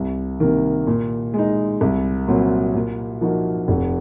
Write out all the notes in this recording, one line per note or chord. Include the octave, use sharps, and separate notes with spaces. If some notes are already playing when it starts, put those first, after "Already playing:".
Already playing: C2
C3 D#3 A#3
A#2
G#3 D#4
C2
A#2 F#3 C4
A#2
F3 A#3 D#4 F#4
F1